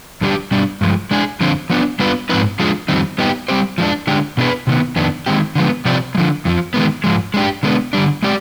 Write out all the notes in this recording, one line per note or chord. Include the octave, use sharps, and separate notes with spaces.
F2 D3 G3 D4 G4
B2 G3 D4
G2 F3 G#3
G#3 D4 G#4
F2 D3 F3 C4
F3 B3 D4
G3 B3 D4 F4 B4
G#2 F3 C4 D#4 B4
F3 G#3 D4 F4 G#4
F2 D#3 G3 C4 D#4
G3 B3 D#4 G4
G3 C4 G4 C5
F3 G#3 D4
D3 G#3 D4 G4
B2 B3 D4 G#4 B4
C3 D#3 B3
F2 D#3 B3 D4
D#3 G#3 C4 G4
D3 F3 G#3 B3
C3 F3 C4 G4 D5
G#3
D3 F3
F2 D3 F3
D#3 G#3 B3
G#2 F3 G#3
G#3 D4 G4
D3 G#3 B3 D4
D3 G3 D4
G#3 C4 G4 D5